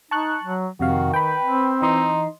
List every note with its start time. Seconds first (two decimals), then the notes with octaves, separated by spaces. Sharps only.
0.11 D#4 A5 C#6 F#6
0.43 F#3
0.80 F2 C3 D#3 F#4 F5
1.14 B4 G5 B5
1.43 C4
1.82 E3 D#4 D#5 C6